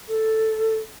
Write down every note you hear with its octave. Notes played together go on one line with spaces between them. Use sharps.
A4